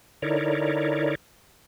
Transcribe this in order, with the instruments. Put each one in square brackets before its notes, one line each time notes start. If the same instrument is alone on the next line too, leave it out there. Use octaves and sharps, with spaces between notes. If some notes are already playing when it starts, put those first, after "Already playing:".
[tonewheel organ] D3 D#4 E4 A#4 C#5 D5